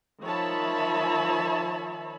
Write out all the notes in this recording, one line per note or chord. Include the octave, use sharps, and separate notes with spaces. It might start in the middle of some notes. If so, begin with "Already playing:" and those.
D#3 F3 C#5 E5 A5 B5